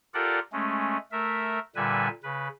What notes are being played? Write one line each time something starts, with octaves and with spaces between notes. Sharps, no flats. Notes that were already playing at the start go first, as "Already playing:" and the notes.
F4 G4 A4 A#4 D5 F#5
G#3 A3 C#4
A3 A#4 E5
A#2 D3 G3 B4 E5 G#5
C#3 B4